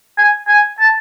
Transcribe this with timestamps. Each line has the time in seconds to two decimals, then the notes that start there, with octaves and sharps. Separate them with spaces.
0.18 G#5
0.48 G#5
0.79 A5